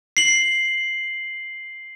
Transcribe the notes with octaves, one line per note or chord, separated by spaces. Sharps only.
C7 F#7